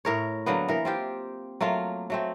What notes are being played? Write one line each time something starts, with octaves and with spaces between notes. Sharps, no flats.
A2 A#4 C#5
D3 F#3 A#3 B3
E3 A#4
C4 F4 G4
F#3 A3 A#3 F4
F#3 A3 C4